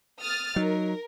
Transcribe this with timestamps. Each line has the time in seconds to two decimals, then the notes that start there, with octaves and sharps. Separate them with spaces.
0.20 D#6 F6 A6
0.56 F#3 D#4 A#4